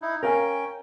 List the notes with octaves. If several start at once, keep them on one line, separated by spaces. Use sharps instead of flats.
D#4 E4
C#4 A#4 F5 G5 G#5